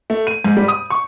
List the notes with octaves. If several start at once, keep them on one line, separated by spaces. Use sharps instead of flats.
A3
D#7
G#2
G3
D#6
C#6